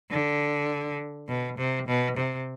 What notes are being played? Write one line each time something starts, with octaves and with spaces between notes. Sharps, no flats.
D3
B2
C3
B2
C3